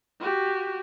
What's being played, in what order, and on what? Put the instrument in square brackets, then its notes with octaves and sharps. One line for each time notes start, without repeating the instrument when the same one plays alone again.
[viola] F#4 G4